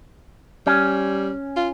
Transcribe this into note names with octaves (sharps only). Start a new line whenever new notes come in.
G3 C#4
F4